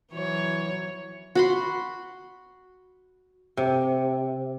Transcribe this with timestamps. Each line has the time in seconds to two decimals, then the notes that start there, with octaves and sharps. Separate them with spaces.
0.13 E3 F#3 C#5
1.35 F#4 B5 C6
3.57 C3